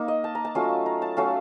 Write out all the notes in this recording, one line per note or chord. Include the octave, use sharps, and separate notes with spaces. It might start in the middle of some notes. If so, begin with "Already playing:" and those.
Already playing: A#3 D#4
D#5
A5
A#5
A5
F#3 A3 C#4 F4
A#5
A5
F#3 A3 C#4 F5